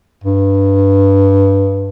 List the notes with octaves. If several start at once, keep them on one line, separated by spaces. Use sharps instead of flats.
G2